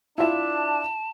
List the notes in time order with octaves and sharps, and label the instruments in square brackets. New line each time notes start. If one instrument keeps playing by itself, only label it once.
[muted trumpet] D4 [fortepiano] E4 F4 E5 [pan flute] A5